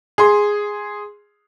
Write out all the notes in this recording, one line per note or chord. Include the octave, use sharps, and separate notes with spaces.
G#4 C6